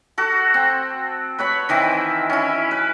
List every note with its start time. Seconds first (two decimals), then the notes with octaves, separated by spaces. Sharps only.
0.18 F#4 A4
0.54 C4
1.39 B4 C#5 B5
1.69 D#3 E3 C4 E5
2.30 C#4 E4
2.71 B4